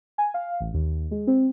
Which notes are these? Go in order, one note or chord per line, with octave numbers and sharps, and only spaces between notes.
G#5
F5
A1
D#2
G#3
C4